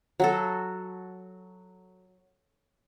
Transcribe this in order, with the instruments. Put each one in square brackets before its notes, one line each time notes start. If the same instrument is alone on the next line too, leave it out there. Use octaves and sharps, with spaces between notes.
[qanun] F#3 F#4 A4